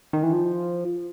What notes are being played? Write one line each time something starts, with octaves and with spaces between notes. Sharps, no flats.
D#3
E3
F3